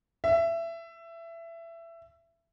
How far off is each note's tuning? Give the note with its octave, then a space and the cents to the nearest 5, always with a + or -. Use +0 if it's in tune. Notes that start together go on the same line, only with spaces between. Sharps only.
E5 +20